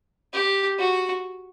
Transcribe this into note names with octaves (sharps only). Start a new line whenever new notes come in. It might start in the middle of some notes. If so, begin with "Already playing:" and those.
G4
F#4